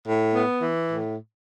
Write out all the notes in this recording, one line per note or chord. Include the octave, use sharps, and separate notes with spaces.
A2
B3
E3
A2